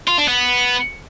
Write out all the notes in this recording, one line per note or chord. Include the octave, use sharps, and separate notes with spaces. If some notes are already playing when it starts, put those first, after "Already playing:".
F4
D4
B3